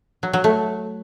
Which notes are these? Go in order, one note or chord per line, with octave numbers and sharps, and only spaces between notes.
F#3
F#3
A3